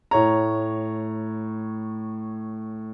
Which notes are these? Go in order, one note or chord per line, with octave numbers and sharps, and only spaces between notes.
A2 C#5 A#5